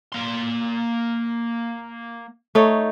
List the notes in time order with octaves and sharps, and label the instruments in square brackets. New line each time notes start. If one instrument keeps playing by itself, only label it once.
[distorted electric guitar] A#3 C6
[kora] A3 D#4 C#5